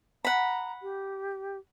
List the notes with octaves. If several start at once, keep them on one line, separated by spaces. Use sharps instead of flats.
F#5 A#5 B5
G4